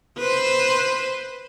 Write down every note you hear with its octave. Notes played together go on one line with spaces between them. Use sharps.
B4 C5